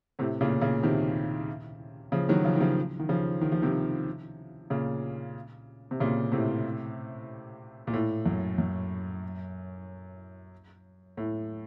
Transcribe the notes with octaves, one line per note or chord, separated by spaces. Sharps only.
A2 C3
A#2 C#3
A#2 C#3
C3 D#3
C#3 F3
D#3 F#3
C#3 F3
D#3
C#3 F3
D#3
C#3 F3
D#3
F3
C3 D#3
A#2 C#3
C3
A#2 C#3
A2 C3
A#2
A2
F#2
F#2
A2